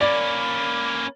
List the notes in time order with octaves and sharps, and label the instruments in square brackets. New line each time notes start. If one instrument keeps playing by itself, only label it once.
[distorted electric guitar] A#3 C#4 [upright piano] D5 [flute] B5